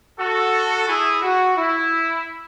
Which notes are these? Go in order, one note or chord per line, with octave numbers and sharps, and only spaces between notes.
F#4 A4
E4 G#4
F#4
E4